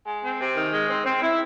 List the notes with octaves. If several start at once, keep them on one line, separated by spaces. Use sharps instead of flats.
G#3
C4
C3
D#3
G#3
C4
C4
E4